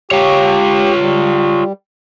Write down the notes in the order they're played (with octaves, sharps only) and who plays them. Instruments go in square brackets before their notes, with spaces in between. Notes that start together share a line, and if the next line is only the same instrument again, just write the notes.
[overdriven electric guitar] F4 C#5 [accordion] G4
[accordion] G3